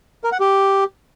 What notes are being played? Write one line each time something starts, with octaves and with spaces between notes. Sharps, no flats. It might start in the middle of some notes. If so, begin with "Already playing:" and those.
A#4
F#5
G4